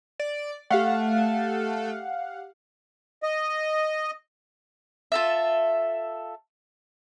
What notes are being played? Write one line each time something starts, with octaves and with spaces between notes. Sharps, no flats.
D5
A3 G4 F5 F#5
D#5
F4 A4 E5